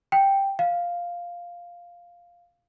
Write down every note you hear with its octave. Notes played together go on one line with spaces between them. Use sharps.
G5
F5